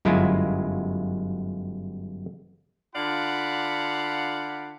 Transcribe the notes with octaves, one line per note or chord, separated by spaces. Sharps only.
G1 F#2 G#3 E4 F4
D3 F4 D5 F5 F#5 B5